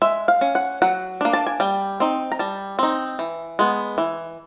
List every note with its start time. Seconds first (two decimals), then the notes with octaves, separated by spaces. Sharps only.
0.02 G#3 E5
0.28 F5
0.41 C#4
0.55 F#5
0.82 F#3 F#5
1.21 A#3 D4
1.33 A5
1.47 G#5
1.60 G3 G5
2.00 C4 D#4
2.32 A#5
2.39 G3 A5
2.79 C4 D#4
3.19 E3
3.59 G#3 B3
3.98 E3